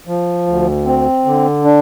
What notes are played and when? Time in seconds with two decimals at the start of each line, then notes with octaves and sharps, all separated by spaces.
0.07 F3
0.47 D2
0.86 C4
1.26 D3
1.64 D4